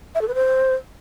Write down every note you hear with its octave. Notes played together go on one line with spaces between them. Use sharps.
E5
A4
B4
C5